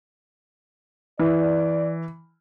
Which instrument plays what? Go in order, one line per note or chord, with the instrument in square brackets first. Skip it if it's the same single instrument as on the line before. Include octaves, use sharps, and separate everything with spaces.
[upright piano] E3 [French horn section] D5